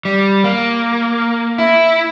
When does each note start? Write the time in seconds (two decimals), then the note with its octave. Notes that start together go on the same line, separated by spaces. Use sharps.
0.05 G3
0.44 A#3
1.58 E4